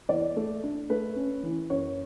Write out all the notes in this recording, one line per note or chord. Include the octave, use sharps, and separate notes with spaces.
E2 D5
A3
D4
A3 B4
C#4
E3
F#2 C#5